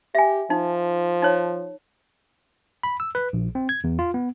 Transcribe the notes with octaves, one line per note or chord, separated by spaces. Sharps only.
G4 E5 G#5
F3 D#4
D#4 C#5
B5
E6
B4
A#1
C4
G#6
E2
F4
B3